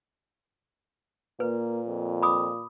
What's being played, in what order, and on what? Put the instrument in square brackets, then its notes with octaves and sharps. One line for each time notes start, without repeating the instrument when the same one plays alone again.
[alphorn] A#2 [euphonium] A#3 [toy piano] B4
[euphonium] F2
[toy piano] B5 D6 D#6